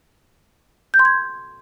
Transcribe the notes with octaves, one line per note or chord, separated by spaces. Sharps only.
G6
C6
G#6